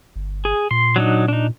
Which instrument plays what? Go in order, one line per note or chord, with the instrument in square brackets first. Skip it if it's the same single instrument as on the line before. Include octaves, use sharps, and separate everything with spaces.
[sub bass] G1
[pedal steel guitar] G#4
[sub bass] A#2 [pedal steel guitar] C6
[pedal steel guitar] F#3 D4 D#4
D4 D#4